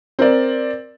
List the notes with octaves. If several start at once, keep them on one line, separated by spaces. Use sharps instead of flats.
C4 A#4 D5